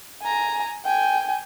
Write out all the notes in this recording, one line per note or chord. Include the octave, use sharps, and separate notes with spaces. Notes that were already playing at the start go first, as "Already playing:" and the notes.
G#5 A#5
G5 G#5